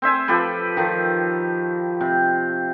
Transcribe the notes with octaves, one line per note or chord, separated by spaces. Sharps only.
C4 C5 E5 G#5
F3 G4 A4 B4
D#3 F3
C3